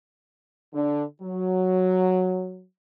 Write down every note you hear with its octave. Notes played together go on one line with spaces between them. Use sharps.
D3
F#3